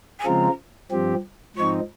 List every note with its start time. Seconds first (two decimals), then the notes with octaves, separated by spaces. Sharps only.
0.19 G#5
0.25 C#3 F3 G#3 C4 F4 A#5
0.91 G2 F3 C4 G4
1.56 G#2 F3 C4 D#4 C#6